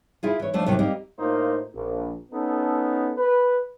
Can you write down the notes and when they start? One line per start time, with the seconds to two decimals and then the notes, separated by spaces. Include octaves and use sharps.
0.23 E4 F4 G#4
0.39 E3 C#5
0.54 F3 A3 D4
0.66 D#2 C3 F#3 D#4
0.79 G3 A#3 C4 D#4 G4 D#5
1.19 A2 A#3 D#4 F4 C5
1.74 A#1
2.32 B3 C#4 D#4 A4
3.17 B4